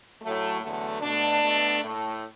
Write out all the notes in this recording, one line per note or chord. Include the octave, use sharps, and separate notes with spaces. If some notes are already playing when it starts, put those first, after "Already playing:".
A2 F#3 A3
E2 D3 F#3 A3
B2 A3 D4
B2 A3
A2 A3